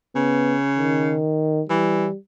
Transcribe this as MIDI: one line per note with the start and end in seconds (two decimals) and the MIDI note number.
0.15 1.20 49
0.15 0.56 59
0.78 1.62 51
1.69 2.08 52
1.69 2.16 55